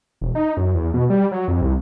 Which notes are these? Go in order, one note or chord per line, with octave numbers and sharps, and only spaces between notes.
E1
D#4
F#2
E2
B2
G3
F#3
F2
C2